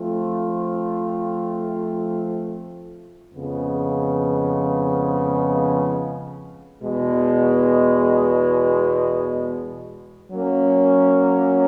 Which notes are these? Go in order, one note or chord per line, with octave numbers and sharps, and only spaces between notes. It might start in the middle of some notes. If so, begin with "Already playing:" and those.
Already playing: F3 A3 C4 F4
F2 C#3 F3 G#3 B3
E2 B2 G#3
F#3 A#3 C#4